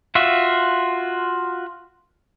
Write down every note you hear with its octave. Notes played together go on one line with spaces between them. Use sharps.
F4 F#4 E5